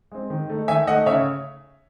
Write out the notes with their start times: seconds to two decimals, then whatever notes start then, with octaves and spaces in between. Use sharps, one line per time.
0.12 G#3 C4
0.30 D#3
0.50 A3 D#4
0.68 D#3 E5 G#5
0.87 A3 D#4 D#5 F#5
1.06 C#3 C#5 E5